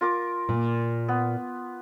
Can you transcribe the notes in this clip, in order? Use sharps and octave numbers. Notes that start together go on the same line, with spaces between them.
F4 A#4 D6
A#2
B3